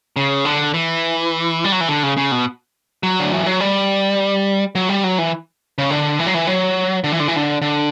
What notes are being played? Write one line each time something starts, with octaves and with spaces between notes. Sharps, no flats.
C#3
D3
E3
G3
F#3
E3
D3
C#3
C#3
B2
F#3
D3
E3
F#3
G3
F#3
G3
F#3
E3
C#3
D3
E3
F#3
E3
F#3
D3
E3
D3
E3
D3
D3